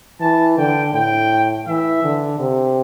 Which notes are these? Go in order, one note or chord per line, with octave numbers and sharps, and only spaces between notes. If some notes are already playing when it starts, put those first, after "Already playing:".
E3 A5
D3 G5
A2 G5
E3 E5
D3
C3